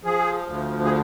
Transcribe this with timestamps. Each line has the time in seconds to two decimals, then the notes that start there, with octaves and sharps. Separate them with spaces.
0.04 F3 G#4
0.47 D2
0.85 G#4